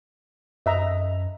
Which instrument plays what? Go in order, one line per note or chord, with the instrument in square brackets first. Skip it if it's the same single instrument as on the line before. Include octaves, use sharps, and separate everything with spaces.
[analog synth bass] F#2 [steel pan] D#5 E5 A#5